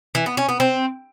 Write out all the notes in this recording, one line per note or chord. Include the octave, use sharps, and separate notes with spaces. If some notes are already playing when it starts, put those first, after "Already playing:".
E3
B3
C#4
B3
C4